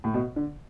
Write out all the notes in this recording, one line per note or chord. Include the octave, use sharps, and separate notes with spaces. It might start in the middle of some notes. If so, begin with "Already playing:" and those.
A2
B2
D3